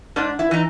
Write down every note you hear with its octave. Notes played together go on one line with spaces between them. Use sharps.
G#2 D4
E4
E3 D#4